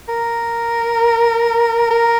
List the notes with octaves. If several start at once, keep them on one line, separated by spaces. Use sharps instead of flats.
A#4
A#4